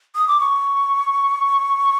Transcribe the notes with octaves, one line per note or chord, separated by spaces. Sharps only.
D#6
D6
C#6